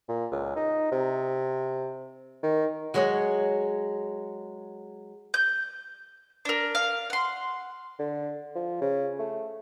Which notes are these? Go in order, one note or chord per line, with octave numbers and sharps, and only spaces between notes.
A#2
C#2
D#4
C3
D#3
F#3 G#3 C#5 D#5 F#5
G6
D4 A#4
F5
F#5 C6
D3
F3
C#3
A3